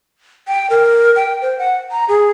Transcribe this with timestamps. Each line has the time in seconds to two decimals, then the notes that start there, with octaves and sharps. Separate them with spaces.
0.48 G5
0.70 A#4
1.16 G5
1.42 C5
1.59 F#5
1.91 A#5
2.09 G#4